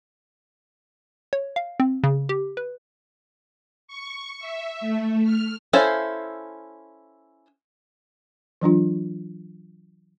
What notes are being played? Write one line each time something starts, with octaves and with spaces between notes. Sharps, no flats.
C#5
F5
C4
C#3
G4
B4
C#6
E5
A3
F6
C#4 E4 A4 C5 F5
E3 F#3 D4 F4